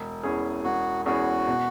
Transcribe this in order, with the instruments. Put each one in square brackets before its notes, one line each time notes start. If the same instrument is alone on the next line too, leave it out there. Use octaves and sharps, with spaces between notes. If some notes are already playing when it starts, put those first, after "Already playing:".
Already playing: [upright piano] E1
E2 E3 C#4 G#4
[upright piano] E1 [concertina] F#4
[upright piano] E2 E3 C#4 G#4 [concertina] F#4
[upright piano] B2